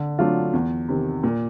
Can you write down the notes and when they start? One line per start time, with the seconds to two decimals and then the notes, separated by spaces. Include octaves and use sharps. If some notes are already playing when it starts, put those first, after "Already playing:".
Already playing: D3
0.19 F#3 A3 D4 F4
0.53 E2
0.89 C3 D#3
1.24 A#2